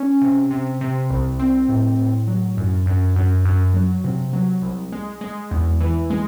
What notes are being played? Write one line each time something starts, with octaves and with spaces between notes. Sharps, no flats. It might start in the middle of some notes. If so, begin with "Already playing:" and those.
Already playing: C#4
C3
C3
C3
C2
C4
A2
A2
F#3
F#2
F#2
F#2
F#2
F#3
C3
F#3
C2
G#3
G#3
E2
E3
G#3